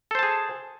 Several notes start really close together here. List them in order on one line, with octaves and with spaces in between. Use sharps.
A4 C5 A5 G#4